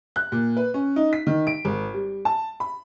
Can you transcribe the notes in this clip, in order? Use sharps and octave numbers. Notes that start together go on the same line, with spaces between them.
F#6
A#2
B4
C#4
D#4
B6
D#3
D7
G#1
G3
A5
B5